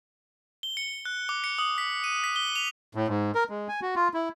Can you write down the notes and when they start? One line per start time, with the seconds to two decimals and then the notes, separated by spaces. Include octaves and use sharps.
0.63 G7
0.77 C#7
1.05 F#6
1.29 D6
1.44 C#7
1.58 D#6
1.78 B6
2.04 D#7
2.24 B6
2.36 G7
2.56 F7
2.95 A2
3.08 G#2
3.35 A#4
3.49 G#3
3.68 G#5
3.82 F#4
3.96 F4
4.14 E4